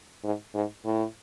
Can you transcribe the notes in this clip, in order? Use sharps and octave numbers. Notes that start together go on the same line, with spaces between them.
G#2
G#2
A2